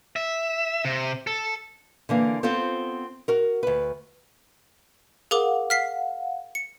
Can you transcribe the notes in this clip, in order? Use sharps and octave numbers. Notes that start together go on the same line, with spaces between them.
E5
C3
A4
D3 E3 A#3
B3 C4 F4 A4 C5
F#4 A#4
D2 B4
G#4 A#4 F5 F#5 D6
F6 B6 C7
C#7